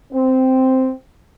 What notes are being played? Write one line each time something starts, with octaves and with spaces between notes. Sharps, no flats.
C4